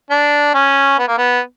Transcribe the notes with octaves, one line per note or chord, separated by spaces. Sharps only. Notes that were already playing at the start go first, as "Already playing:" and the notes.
D4
C#4
B3
A#3
B3